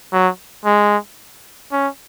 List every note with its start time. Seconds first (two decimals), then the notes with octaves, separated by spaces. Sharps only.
0.13 F#3
0.65 G#3
1.72 C#4